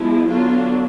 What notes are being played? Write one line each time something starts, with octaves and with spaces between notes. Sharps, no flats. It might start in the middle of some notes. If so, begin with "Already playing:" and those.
Already playing: F3 G#3 B3 E4
D3 F#3 B3 D4 F4